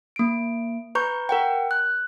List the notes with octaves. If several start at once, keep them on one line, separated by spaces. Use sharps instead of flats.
A#3 D7
B4 A#5 C#6 G6
A#4 F#5 G5
F#6